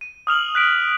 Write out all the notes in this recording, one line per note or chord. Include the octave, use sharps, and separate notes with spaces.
D#7
D#6 F6 F7 F#7
F#6 B6 D7